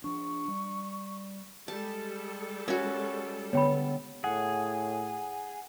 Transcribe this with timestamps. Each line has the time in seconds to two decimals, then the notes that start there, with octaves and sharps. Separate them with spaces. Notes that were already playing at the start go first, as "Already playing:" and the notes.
0.04 F3 D4 C#6
0.48 G3
1.68 G3 G#3 A4 A5
2.68 C#4 F#4 A#4
3.53 D3 B3 C#5 G5 B5
4.24 A2 G#4 F#5